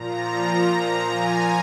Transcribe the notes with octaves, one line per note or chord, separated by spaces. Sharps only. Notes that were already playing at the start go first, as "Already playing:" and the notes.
Already playing: A#2 F3 A#5
A#5
G#5